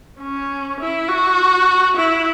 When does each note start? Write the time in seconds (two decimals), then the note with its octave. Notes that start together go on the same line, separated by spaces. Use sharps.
0.21 C#4
0.80 E4
1.08 F#4
1.97 E4